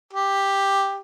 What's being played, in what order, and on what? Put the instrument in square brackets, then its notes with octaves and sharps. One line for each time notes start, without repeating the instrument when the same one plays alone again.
[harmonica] G4